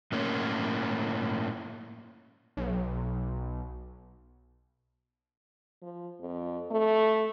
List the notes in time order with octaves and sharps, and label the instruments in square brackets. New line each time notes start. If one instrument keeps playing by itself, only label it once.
[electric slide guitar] A2 A#3 C#4
[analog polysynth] B1
[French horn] F3
F2
A3